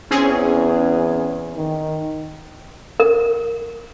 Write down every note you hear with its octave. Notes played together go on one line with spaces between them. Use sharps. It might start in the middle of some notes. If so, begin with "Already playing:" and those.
E2 C4 C#4 G#4
D#3
A#4